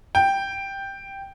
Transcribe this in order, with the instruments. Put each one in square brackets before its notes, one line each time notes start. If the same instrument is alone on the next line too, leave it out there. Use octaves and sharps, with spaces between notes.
[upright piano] G5